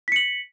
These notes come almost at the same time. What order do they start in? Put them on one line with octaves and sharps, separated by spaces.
B6 C#7 F#7